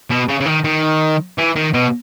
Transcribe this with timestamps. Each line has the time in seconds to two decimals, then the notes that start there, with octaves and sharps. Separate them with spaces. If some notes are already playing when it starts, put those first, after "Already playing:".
0.11 B2
0.29 C#3
0.40 C#3
0.46 D#3
0.64 D#3
1.38 E3
1.56 D#3
1.73 B2